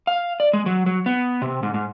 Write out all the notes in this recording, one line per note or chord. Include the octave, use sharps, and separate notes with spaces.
F5
D5
G#3
F#3
F#3
B3
C3
G#2
G#2